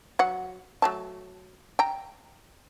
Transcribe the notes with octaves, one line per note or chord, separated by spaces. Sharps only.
F#3 F#5
F#3 A3 A5
G5 A#5